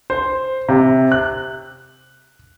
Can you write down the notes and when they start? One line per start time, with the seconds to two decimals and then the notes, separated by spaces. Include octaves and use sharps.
0.10 C5
0.69 C3
1.12 F#6